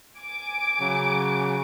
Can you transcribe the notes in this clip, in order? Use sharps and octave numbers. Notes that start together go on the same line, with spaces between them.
G#5 D6 D7
C#3 F#3